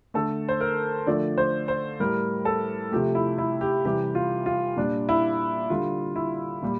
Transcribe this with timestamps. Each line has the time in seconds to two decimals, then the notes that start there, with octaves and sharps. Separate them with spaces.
0.14 D3 A3 A4
0.49 C5
0.61 A#4
1.06 D3 F3 A3 D5
1.38 C5
1.68 C5
2.00 A2 G3 A#4
2.45 A4
2.92 C3 F3 A3 G4
3.15 E4
3.38 E4
3.61 G4
3.85 C3 E3 G3 G4
4.15 F4
4.46 F4
4.77 A#2 G3 D4
5.09 E4
5.70 D3 G3 F4
6.16 E4
6.62 A#2 G3